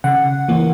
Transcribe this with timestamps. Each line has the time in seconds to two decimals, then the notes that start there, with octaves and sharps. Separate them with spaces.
0.04 C#3 F#5
0.48 E3 A#3